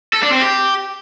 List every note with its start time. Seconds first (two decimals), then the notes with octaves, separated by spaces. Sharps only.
0.13 A4
0.23 D4
0.32 C4
0.42 G4